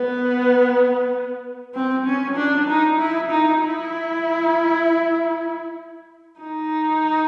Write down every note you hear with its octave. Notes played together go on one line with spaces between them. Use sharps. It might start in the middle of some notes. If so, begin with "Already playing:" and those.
Already playing: B3
C4
C#4
D4
D#4
E4
D#4
E4
D#4